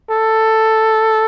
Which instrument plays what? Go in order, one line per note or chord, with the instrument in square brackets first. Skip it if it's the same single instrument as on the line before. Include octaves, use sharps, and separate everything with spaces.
[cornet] A4